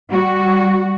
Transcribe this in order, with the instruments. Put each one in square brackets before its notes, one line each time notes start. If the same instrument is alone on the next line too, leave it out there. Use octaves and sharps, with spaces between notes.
[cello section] G3 F#4